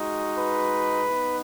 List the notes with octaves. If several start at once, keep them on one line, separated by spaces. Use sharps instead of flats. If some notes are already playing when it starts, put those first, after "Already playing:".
Already playing: G#3 D#4 F#4
B4
B3 D#4